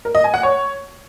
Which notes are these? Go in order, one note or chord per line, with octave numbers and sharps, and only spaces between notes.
A#4
D#5
G#5
F#5
C#5